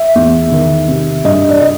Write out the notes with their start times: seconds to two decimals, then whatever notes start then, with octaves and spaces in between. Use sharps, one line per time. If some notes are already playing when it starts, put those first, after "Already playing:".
Already playing: E5
0.15 E2
0.51 D#3
0.88 C3
1.24 G2 D#5
1.49 D5
1.61 D#5